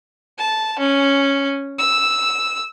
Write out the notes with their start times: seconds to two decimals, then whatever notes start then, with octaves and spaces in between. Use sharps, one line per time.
0.38 A5
0.79 C#4
1.78 E6